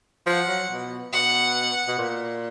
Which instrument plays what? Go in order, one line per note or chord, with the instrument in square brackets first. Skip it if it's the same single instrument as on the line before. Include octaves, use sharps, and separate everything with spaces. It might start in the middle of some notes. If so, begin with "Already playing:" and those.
[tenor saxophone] F3 [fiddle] F#5
[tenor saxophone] F#3
B2
[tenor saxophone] B2 [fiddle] F#5
[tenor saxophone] B2
A#2